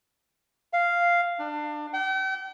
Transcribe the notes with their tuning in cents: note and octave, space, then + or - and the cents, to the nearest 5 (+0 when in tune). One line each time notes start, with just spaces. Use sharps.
F5 -5
D4 +25
G5 -40